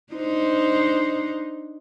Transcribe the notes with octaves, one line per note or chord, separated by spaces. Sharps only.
D4 D#4 C5